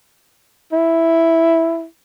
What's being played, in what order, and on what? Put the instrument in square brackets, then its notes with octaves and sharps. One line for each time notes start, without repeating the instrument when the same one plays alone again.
[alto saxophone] E4